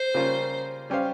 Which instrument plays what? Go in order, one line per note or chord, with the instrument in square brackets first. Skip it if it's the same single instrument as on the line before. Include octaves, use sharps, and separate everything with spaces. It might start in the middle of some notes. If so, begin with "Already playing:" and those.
Already playing: [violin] C5
[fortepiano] C#3 G3 A#3 C#4 F4
G3 C#4 G4 C5 F5